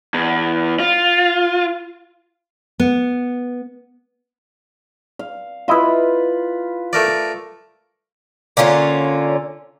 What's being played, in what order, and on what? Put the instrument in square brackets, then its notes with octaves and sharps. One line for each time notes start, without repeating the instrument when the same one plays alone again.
[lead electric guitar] E2
F4
[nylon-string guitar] B3
[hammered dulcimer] F5
[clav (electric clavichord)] E4 D#5 E5 [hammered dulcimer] F4 B4
[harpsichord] A3 A#4 D5
[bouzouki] D3 A#3 C#4 F4